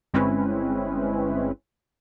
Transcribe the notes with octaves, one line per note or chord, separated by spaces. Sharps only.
G1 G#3 C4 C#4 E4 B4